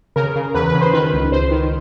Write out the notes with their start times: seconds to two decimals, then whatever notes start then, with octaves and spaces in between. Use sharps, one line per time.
0.16 C#3 A#4
0.35 C#3
0.54 E2 B4
0.67 B4
0.74 C#3
0.81 C5
0.93 D#3 B4
1.13 C#2
1.32 C#2 C5
1.51 D#3